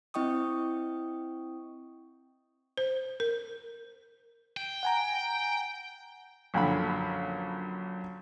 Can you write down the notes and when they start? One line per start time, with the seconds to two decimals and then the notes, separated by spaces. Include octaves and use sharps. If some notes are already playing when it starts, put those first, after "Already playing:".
0.14 C4 E4 D#5 G5 C#6 D#6
2.78 C5
3.20 A#4
4.57 G5
4.83 F#5 G#5 A#5
6.54 A#1 F#2 D3 B5